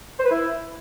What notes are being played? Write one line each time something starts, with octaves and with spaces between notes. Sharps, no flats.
C5
B4
E4